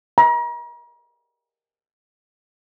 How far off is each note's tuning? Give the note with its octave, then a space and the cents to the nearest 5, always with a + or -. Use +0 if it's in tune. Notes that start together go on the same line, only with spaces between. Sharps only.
A#5 +40